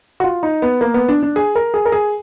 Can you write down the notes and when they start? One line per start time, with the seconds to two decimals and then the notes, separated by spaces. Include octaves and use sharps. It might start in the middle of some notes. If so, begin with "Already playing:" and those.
0.20 F#4
0.24 F4
0.43 D#4
0.62 B3
0.81 A#3
0.94 B3
1.08 D4
1.23 D4
1.36 G#4
1.55 A#4
1.74 G#4
1.85 A#4
1.92 G#4